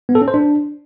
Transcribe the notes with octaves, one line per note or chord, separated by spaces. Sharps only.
B3
A4
C#4
C5
D4